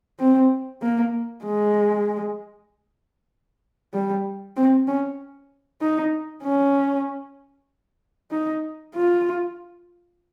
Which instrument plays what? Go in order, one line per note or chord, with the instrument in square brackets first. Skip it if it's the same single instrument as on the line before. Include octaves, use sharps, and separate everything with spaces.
[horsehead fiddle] C4
A#3
G#3
G3
C4
C#4
D#4
C#4
D#4
F4